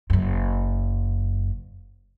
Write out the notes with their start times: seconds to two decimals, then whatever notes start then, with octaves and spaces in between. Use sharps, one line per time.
0.10 F#1 F#2